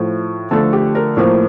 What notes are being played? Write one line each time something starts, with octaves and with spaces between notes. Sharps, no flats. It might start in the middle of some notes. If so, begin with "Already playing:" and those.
Already playing: A2 F3 A3
D3 F3 A3 A4
G4
A#4
A2 F3 A#3 C5